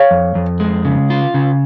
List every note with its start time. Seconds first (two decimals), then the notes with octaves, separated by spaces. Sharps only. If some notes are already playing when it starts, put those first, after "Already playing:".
Already playing: C#5 F5
0.11 F2
0.35 F2
0.60 G#3
0.85 C#3
1.10 F4
1.34 C#3